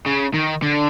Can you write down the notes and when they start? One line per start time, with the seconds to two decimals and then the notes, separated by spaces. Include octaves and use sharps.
0.06 C#3
0.34 D#3
0.62 D3